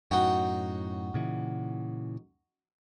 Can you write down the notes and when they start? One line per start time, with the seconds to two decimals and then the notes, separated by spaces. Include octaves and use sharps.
0.11 F#2 A2 D#4 F#4 G5
1.14 A#2 C#3 E3